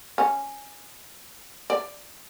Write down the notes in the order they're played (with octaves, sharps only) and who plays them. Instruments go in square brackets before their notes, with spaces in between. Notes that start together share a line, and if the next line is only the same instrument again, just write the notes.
[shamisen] C#4
D5